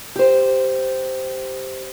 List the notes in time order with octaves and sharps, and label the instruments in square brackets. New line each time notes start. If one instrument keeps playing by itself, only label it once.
[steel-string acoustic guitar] G4 C5